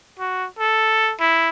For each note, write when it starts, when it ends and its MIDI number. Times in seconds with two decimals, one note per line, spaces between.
0.19 0.46 66
0.59 1.13 69
1.20 1.49 64